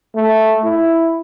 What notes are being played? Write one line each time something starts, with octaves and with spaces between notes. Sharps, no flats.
A3
E4